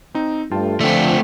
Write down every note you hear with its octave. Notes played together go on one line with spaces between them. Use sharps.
C4 D#4
G2 A3 F4 G5 A5
D3 F3 A3 C4 D5